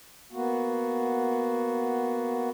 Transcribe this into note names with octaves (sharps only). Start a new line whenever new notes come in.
A#3 B3 F#4